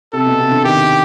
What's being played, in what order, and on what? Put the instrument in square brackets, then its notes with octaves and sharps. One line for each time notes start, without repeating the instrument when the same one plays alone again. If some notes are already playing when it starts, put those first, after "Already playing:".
[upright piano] C3 [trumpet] A4
[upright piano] B2
C3
D3
[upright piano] D#3 [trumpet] G4